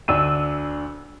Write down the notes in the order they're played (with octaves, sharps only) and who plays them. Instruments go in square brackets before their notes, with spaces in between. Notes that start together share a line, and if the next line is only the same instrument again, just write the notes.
[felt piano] D2 D4 [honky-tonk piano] E6 D#7